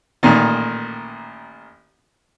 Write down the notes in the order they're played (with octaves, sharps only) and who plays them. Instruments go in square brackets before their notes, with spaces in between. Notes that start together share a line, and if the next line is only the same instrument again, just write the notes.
[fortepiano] A1 A#2 D#3